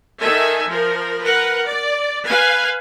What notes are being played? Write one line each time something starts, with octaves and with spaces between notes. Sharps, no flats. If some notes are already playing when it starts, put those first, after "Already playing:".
D#3 A4 E5 G#5
F3 A#4
A#4 B4 F#5
D5
B4 F5 G#5